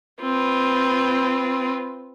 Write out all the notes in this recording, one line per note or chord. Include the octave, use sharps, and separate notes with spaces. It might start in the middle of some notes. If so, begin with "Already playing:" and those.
C4 F4 B4